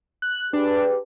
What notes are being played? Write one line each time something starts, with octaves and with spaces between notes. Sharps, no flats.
F#6
D4 G4 G#4 B4